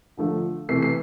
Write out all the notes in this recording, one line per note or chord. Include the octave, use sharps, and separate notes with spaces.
D3 F3 A3
C3 E3 A3 C7
C7